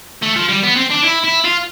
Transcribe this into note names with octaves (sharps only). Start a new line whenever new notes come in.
A3
F3
G3
B3
C4
D4
E4
E4
F4